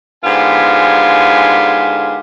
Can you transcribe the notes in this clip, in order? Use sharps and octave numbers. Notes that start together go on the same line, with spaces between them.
G#2 D3 B3 F4 G4 G#5